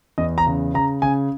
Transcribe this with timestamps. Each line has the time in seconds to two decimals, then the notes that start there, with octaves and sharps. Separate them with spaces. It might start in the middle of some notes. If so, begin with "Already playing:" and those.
0.18 E2 D#5
0.38 A#5
0.47 C#3
0.74 C#3 A#5
1.02 C#3 G#5